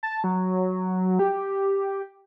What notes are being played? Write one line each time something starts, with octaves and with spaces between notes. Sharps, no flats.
A5
F#3
G4